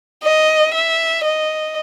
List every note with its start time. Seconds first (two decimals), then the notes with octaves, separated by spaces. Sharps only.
0.23 D#5
0.74 E5
1.24 D#5